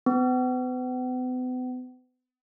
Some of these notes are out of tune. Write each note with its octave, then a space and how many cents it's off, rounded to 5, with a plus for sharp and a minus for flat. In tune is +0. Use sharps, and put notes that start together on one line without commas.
B3 +40